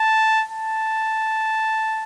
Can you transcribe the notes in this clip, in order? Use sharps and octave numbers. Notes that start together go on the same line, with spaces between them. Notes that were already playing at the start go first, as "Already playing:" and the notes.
Already playing: A5
A5